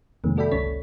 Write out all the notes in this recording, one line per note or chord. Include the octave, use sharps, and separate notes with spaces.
F2 C3 D#3 G#3 A#3
F#4 A4 D5 E5 G5 B5
G1 C#2 C#4 A4 C#5 B6